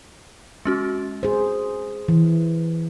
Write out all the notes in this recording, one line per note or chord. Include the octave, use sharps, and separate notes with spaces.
G#3 C#4 F#4
G#4 C5
E3